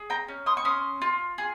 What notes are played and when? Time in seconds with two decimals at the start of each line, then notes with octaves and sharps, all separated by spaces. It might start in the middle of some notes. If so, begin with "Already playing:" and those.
Already playing: G#4
0.10 G5 A#5
0.28 C#4
0.46 C6 D#6
0.57 C#6
0.65 C#4 C6 D#6
1.02 F4
1.38 G#4